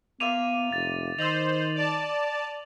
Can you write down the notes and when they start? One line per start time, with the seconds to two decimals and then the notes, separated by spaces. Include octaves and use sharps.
0.20 A#3 B3 F4 E5 D6 D#7 F7
0.72 F1 A6
1.18 D#3 C5 D#5 E6 F7 F#7
1.75 D5 A5